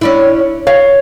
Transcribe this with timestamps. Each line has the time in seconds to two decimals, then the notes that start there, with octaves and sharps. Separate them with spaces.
0.01 C#4 D4 E4
0.67 C#5 F5